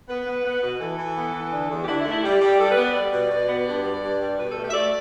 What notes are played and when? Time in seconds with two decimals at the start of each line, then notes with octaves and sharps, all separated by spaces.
0.09 B3 B4
0.27 B3
0.45 B3
0.62 B2
0.80 E3 A4
0.98 E3
1.16 B3
1.34 E3
1.52 D3
1.70 E2
1.84 G4
1.88 D3 E4
2.00 E4
2.06 A3
2.11 E4
2.24 G3 G4
2.41 G3
2.59 G3 A4
2.71 B4
2.77 B3
2.83 D5
2.95 G3
3.13 B2
3.30 B2 D5
3.49 B3
3.66 G2
3.84 G3
4.02 G2
4.19 G3
4.38 B2 B4
4.50 A4
4.56 A3
4.62 G4
4.69 E5
4.74 A3 D5